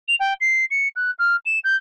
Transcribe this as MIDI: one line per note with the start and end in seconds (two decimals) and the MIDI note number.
0.08 0.16 101
0.20 0.34 79
0.41 0.65 96
0.71 0.88 97
0.96 1.11 90
1.19 1.36 89
1.46 1.59 100
1.64 1.76 91